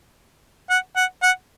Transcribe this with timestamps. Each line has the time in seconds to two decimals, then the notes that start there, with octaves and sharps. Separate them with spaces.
0.70 F#5
0.96 F#5
1.22 F#5